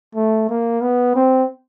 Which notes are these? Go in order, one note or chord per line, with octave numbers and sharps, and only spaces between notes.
A3
A#3
B3
C4